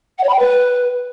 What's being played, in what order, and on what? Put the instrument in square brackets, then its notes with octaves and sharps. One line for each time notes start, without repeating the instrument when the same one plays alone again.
[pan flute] F#5
C#5
B5
G5
B4